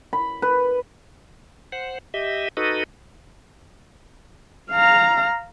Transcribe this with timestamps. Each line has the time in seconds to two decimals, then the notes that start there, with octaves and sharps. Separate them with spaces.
0.13 B5
0.42 B4
1.72 C5 F#5
2.14 G4 D#5 E5
2.57 D#4 F#4 A4 B4 D#5
4.71 F5 A#5